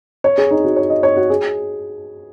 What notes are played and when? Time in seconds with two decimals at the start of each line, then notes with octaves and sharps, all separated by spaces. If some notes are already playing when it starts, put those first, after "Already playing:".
0.24 C#5
0.38 G#4
0.51 D#4
0.64 F#4
0.76 C#5
0.90 D#5
1.03 C#5
1.16 F#4
1.30 G#4